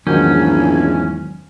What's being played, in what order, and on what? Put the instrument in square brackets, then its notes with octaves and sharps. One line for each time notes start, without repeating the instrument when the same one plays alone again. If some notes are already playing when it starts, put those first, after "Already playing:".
[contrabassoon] A#1 [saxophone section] E2 G#2 [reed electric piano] D#3 F#3 G6 [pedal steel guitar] C#4